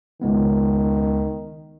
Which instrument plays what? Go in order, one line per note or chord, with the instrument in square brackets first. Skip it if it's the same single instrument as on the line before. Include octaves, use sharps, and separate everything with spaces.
[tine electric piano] C#2 G#3 B3 [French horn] D#3